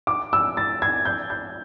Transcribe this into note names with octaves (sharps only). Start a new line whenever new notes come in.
D6
E6
A6
G#6
G6
G6